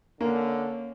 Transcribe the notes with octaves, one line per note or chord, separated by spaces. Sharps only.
D3 A#3 C#4